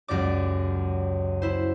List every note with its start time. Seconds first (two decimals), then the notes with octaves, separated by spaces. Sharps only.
0.08 C#2 F#2 G4 D5 D6
1.42 E4 C5